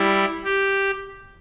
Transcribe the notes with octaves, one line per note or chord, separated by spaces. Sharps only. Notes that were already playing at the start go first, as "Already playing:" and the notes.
Already playing: G3 E4
G4